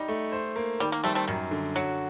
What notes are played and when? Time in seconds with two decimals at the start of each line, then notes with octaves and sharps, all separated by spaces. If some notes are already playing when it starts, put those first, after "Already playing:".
Already playing: G3 D#4
0.08 A3
0.32 C5
0.56 A#3
0.80 D#3 G3
0.92 A#3
1.04 G3 A3 C4
1.15 A3 C4
1.28 F#2 D#3
1.51 D3
1.75 F#3 F#4